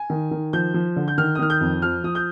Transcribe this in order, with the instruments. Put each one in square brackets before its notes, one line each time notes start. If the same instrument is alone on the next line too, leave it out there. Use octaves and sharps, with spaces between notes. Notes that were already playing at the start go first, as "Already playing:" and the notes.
Already playing: [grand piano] G#5
D#3
D#3
F3 G6
F3
D3
G6
D#3 F6
D#6
D#3 F6
G6
F2
F3 F6
F3 D#6
G6